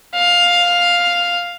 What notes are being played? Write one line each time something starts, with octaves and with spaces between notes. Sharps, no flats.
F5